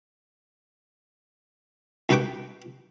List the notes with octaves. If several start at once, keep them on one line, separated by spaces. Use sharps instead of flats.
C2 D#4 F#4 B4 G5 D6